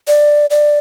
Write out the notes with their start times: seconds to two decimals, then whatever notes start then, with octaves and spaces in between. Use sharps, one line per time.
0.07 D5
0.50 D5